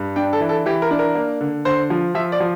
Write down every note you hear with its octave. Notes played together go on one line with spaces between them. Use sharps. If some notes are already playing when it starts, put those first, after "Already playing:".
Already playing: G2
D4 G5
A4
E3
A4
E3 G4
A#4
D4
A#4
A#3
D3
D3 C5
F3
F3 E5
D5
F3